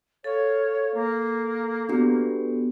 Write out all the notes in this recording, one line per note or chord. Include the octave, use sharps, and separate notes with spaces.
A4 C#5 F5
A#3
B3 D4 F#4 G4